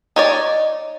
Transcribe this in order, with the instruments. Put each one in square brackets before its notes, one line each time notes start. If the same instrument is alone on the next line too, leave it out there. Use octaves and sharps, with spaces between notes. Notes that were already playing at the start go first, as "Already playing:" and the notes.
[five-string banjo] D#4 C#5 D5